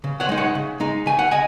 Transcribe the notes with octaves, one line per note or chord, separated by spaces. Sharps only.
C#3
C#5 F#5
G#3 D#4
C#5 F#5
C#3
G#3 D#4
C#3 G#5
F#5
D#5 G#5